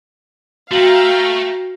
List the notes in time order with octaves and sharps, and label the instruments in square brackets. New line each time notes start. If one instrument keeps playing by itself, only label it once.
[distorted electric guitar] A3 [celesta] F#4 F#7 [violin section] F5 G5 A#5